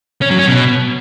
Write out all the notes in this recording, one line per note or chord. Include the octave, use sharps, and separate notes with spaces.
C#4
F#3
C#4
B2